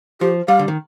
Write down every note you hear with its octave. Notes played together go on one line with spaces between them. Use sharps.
F3 G4
G3 F5
D3
D#3